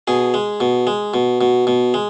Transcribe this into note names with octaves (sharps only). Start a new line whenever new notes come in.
B2 G#4
G#3
B2
G#3
B2
B2
B2
G#3